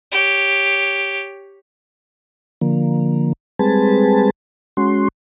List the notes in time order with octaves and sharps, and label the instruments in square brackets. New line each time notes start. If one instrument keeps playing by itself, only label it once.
[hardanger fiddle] G4 C#5
[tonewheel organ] D3 F3 A#3
G3 G#3 C4 G#4 B4 A5
G#3 C#4 F#4 C6